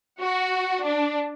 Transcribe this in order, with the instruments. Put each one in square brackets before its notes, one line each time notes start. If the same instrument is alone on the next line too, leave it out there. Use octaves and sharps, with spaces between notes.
[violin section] F#4
D4